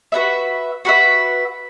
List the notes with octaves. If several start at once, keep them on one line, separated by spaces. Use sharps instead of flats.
F#4 B4 E5
F#4 B4 E5